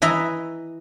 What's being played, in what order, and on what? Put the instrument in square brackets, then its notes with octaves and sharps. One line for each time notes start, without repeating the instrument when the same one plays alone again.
[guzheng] E3 D#5 E5 A#5